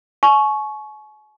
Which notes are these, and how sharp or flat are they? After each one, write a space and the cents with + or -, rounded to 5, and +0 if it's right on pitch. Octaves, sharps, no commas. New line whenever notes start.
G#5 +45 C#6 +0